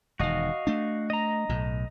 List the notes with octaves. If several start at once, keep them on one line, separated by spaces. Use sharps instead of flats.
E1 D#3 F#4 D#5 F5
A3 D4
D#5 A#5
B1 A2